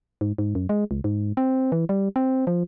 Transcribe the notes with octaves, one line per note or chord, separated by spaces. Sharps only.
G#2
G#2
F#2
G#3
C#2
G#2
C4
E3
G3
C4
F3